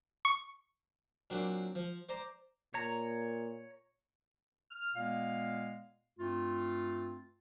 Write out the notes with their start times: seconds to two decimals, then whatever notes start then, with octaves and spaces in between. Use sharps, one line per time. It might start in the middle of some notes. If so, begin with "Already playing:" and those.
0.25 C#6
1.30 A#2 F#3 C4 D4
1.75 F3
2.09 C5 D5 A#5 C6
2.74 A#2 C#5 A#5
4.70 F6
4.95 A#2 G#3 B3 F5
6.19 G2 A3 C4 F4